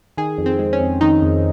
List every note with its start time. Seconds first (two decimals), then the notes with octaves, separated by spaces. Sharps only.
0.17 D#3 G#4
0.38 F2
0.46 C4
0.59 G#3
0.73 C#4
0.80 F2
1.01 D#3 D#4
1.22 F2